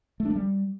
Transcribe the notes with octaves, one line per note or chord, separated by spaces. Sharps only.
A3
D4
A3
G3